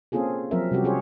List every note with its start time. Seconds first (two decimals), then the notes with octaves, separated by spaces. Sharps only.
0.12 A#3 C4 C#4 F4 G#4 A4
0.51 F3 F#3 C4 A#4 E5
0.71 C3 G3 C#4 F#4 G4
0.84 C#4 F4 G4 G#4 C5 C#5